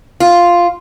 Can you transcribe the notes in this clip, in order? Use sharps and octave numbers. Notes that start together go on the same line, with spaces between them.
F4